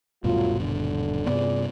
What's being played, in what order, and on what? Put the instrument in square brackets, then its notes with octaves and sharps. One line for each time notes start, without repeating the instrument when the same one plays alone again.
[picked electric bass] D#1 G2 B2 [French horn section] F#3 A3 F4
[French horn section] D3
[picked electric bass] G2 C3 B3 [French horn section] F4 G#4 D5